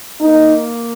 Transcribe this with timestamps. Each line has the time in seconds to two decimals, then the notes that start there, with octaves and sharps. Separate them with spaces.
0.21 A#3 D#4